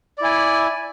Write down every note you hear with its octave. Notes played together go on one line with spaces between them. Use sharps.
E4 D5 G#5